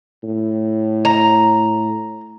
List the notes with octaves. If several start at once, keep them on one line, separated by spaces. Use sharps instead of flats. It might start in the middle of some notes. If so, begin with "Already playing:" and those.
A2
A#5